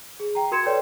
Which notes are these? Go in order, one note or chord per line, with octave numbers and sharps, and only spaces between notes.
G#4
G5 A#5
F#4 A#4 C6 G#6 C#7 E7
A4 B4 C#5 D5 G5